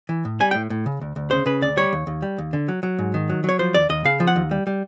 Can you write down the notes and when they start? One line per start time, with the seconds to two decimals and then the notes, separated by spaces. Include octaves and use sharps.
0.09 E3
0.25 A2
0.40 G3 G#5
0.51 A2 G5
0.70 A2
0.86 C#3
1.01 D2
1.16 D2
1.31 C#3 C5
1.46 C#3 B4
1.62 D2 D5
1.77 G3 C#5
1.93 D#2
2.07 D#2
2.22 G3
2.38 D#2
2.53 D3
2.68 F#3
2.83 F#3
2.99 G#2
3.14 D#3
3.30 F#3
3.44 F#3 C#5
3.59 F3 C5
3.74 D#2 D5
3.89 D#2 D#5
4.05 C#3 F5
4.20 F3
4.27 F#5
4.36 D#2
4.51 G3
4.67 G3